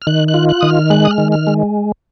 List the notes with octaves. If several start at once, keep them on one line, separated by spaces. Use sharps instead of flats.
F6
D#3 F#6
F#6
F4
F#6
D#3 D#6
F6
G#3 F#6
D#6
F6
D#3
F6
G#3